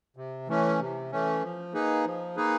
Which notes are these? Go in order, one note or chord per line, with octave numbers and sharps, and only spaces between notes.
C3
E3 A3 C#4
C3
E3 A3 C#4
F3
A#3 D#4 G#4 B4
F3
A#3 D#4 G#4 B4